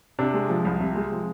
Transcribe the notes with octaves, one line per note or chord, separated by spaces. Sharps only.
C3 D4
G#3
F3
C2
C3
G#3
F3